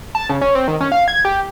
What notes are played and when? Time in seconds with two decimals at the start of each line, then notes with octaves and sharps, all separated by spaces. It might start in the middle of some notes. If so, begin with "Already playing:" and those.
0.15 A5
0.30 C#3
0.41 C#4
0.55 C4
0.68 D#3
0.81 C#4
0.92 F5
1.08 G#6
1.25 G4